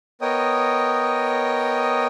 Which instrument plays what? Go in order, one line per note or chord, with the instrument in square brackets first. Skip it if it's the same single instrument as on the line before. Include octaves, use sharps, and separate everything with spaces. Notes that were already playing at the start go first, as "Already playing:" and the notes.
[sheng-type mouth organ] B3 A#4 C#5 D#5 G5 D#6